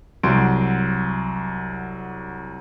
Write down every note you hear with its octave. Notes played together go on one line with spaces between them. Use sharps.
C2 F#3 F#5 C6 D7